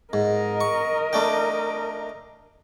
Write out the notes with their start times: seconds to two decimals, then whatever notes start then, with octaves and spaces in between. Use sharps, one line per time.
0.13 G#2 A#4 D#5
0.61 C#6
1.13 A3 D4 G5